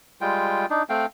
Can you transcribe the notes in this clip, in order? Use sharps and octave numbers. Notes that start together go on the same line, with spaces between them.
G3 G#3 F4 G5
D4 D#4
A3 C4 F5 G5